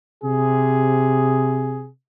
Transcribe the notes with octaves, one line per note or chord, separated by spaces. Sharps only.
C3 G#4